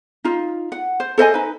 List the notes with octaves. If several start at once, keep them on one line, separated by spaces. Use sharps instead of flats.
D#4 F4
F#5
C5
A4 C5 D#5 G#5
D#4 B4